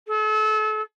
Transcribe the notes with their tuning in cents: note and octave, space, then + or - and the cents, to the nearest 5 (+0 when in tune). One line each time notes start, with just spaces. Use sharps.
A4 -35